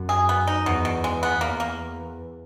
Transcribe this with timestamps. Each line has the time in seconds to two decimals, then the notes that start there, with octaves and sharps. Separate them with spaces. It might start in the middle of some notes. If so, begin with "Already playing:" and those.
Already playing: F#2
0.09 G#4
0.29 B3
0.47 D#4
0.66 E2 B2
0.85 B2
1.04 G#3
1.23 B3
1.41 E2 A#3
1.60 A#3